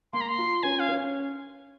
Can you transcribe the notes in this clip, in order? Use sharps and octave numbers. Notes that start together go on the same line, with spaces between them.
A#3 C6
A#5
C6
F4
C#4 G#5
F5
C#4